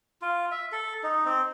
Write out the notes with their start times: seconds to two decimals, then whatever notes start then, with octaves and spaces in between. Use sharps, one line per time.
0.22 F4
0.51 E5
0.72 A4
1.03 D#4
1.25 C4